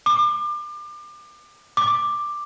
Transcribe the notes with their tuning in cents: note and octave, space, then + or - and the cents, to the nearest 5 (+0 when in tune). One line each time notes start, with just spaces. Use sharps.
D6 +30
D6 +10